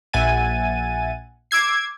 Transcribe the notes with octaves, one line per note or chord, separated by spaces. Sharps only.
A#1 E5 F#5 G#5 A6 D#7
D6 E6 G#6 C7